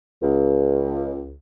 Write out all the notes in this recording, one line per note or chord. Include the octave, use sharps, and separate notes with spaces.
C#2